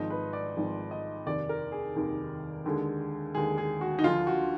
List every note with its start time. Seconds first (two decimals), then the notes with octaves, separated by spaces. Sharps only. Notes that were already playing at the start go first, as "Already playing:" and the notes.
Already playing: G#1 G#2 F3 D#4
0.10 B4
0.33 D5
0.57 G#1 G#2 F3
0.91 D#5
1.26 F1 D#2 D#3 D5
1.49 A#4
1.72 G#4
1.95 F1 D#2 D#3
2.66 D#2 D3 G#3
3.34 D#2 D3 G#3 G#4
3.58 G#4
3.81 F#4
3.99 D#4
4.03 D2 D3 F3 F4
4.27 F#4